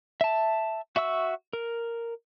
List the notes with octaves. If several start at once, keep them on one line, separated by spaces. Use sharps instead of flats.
E5 A5
F#4 E5 C#6 E6
A#4